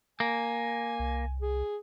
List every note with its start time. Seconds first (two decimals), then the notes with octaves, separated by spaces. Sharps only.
0.20 A#3 G#5
0.99 C2
1.41 G#4